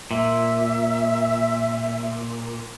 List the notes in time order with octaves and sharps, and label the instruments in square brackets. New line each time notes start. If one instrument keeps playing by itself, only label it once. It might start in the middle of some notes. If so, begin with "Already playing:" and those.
[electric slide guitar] A#2 [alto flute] E5